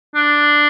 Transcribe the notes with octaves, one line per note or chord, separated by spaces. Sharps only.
D4